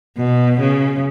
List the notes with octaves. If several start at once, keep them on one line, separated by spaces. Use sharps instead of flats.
B2
C#3